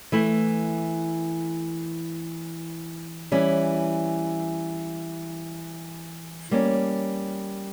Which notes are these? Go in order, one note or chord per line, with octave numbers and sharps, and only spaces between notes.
E3 A3 E4
E3 G3 C#4
G3 A#3 C#4